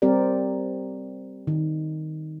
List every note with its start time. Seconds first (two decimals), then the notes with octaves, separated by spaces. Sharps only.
0.02 G3 C4 G4 A#4 D5
1.47 D#3